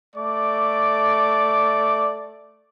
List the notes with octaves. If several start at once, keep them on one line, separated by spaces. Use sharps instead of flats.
A3 D5 D6